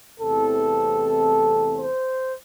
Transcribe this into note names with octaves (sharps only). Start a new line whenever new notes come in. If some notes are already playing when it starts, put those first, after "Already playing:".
E2 C3 E3 A3 C4 A4
C5